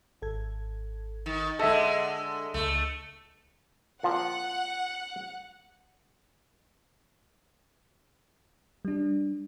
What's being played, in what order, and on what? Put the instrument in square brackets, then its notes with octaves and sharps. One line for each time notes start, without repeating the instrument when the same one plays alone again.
[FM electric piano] G#1 A4 G#6
[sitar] D#3
[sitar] D3 G#3 [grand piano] A4 D#5 E5 [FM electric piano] A#6
[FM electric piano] C#2 [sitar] A3
[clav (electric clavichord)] A#2 F3 C4 [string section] F#5
[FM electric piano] G3 D4